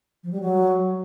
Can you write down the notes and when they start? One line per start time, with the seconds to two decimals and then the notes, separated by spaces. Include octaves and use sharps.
0.23 F3
0.32 G3
0.41 F#3